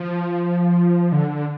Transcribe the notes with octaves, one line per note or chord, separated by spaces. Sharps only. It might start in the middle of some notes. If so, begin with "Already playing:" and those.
Already playing: F3
D3